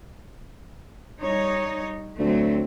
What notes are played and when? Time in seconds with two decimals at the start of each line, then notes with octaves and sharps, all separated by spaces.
1.20 G3 D#4 C#5
2.19 D2 F#3 A3 C4